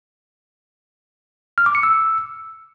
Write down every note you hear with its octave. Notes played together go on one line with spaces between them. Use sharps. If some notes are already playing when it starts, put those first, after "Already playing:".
F6
D6
C#7
E6